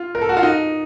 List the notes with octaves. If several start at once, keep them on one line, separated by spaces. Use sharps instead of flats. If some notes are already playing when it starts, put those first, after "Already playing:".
Already playing: F4
A#4
A4
F#4
F4
D#4